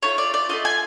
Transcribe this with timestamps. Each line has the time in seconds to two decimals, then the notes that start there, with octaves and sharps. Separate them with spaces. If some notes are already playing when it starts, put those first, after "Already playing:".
0.02 A3 D4 F4 C#5
0.18 D5
0.34 D5
0.49 A3 D4 F4 D#5
0.65 G#5